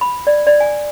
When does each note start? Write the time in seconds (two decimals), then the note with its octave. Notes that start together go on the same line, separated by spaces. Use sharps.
0.01 B5
0.27 D5
0.47 D5
0.60 G#5